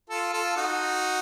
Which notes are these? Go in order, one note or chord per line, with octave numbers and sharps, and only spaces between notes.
F4 A4
F4 A4
D#4 F#4